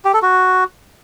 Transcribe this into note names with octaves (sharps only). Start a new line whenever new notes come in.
G4
A4
F#4